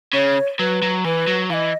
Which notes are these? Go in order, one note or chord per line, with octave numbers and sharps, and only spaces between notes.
C#3 C#5
F#3 B4
F#3
E3 B4
F#3
E3 D#5 F5